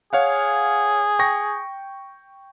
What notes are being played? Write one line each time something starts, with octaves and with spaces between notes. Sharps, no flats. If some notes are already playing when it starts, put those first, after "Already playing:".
G#4 C#5 F5 F#5
G5 C#6 A#6